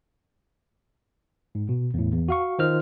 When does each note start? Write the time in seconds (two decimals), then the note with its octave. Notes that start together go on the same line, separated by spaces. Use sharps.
1.55 G#2
1.69 B2
1.94 E2 A2
2.12 E2
2.28 F#4 F5 C#6
2.59 D#3 F4 C5 D#5 F6